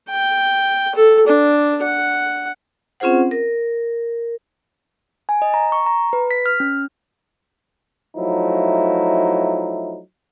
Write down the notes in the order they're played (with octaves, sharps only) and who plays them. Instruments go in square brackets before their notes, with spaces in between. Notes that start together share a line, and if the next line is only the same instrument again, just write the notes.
[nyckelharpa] G5
A4
D4
F#5
[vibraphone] C4 C#4 F4 G#4 C5 F#5
A#4
[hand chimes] G#5
D#5
A#5
C#6
A#5
B4
B6
F6
C#4
[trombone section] F3 F#3 A3 D#4 E4